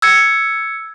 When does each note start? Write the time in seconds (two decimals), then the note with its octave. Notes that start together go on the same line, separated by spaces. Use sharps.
0.02 E6 G#6 C#7